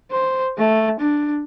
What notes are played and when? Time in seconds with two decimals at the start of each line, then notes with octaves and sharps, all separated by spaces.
0.11 C5
0.58 A3
1.00 D4